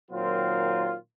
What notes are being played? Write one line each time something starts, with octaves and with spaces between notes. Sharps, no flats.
A#2 D#3 F#3 C4 F4